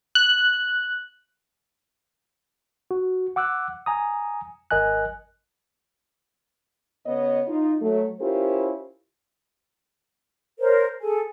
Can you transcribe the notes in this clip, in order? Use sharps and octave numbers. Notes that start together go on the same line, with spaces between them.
F#6
F#4
F#5 D6 E6 F#6
G#5 A#5 D#6
G#1 A#4 D#5 G#5 F#6
C#3 B3 C#5 D#5
D#4 F4
F#3 A3
C#4 E4 F4 G4 A#4 C5
A#4 C5 C#5
G#4 A4 G#5